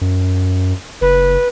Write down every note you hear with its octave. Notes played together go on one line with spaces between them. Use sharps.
F#2
F#1 B4